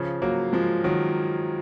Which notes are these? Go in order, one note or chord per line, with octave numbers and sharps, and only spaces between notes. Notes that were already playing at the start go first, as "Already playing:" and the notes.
Already playing: C#3 F3
F#3 A#3
F3 G#3
D#3 F#3